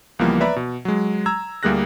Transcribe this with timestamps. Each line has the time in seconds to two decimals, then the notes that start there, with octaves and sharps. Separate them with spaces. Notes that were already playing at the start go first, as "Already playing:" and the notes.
0.19 C#2 E3 F3 G3 A#3 B3
0.41 B4 D5 E5 A#5 B5
0.56 B2
0.85 F#3 G#3
1.26 A#5 E6 G#6
1.63 D2 G3 A#3 G#4 F#6 A#6